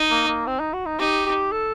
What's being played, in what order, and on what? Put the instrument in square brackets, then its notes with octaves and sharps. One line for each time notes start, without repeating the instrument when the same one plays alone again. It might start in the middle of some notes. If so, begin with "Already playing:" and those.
Already playing: [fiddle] D#4
[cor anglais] A#3
A#3
C4
D#4
F#4
D#4
[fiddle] D#4 [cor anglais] G4
[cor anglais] G4
A4